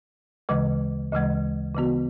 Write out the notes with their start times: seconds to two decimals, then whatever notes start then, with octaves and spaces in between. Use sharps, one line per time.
0.49 D2 C#3 E3 G#3
1.12 D2 C#3 E3 G#3
1.75 C#3 E3 B3 F#4